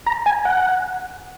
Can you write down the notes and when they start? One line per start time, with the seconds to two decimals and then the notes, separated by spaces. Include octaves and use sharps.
0.06 A#5
0.26 G#5
0.45 F#5